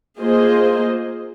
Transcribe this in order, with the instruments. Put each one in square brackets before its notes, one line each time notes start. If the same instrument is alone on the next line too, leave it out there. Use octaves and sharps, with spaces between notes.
[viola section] A#3 F4 G#4 C5 D#5